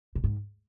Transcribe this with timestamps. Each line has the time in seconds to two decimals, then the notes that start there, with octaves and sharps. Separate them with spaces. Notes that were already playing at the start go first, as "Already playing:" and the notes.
0.15 A#2
0.24 G#2